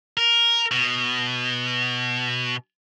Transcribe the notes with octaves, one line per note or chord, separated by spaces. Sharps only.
A#4
B2